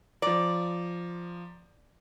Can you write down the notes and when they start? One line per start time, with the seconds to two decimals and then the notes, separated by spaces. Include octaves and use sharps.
0.22 F3 D5 A#5